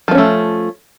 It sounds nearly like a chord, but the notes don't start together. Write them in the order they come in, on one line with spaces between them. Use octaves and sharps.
F3 B3 C#4 A3